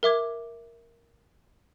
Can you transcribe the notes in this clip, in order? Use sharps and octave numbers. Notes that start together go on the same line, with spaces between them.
A#4 E5 D6 G#6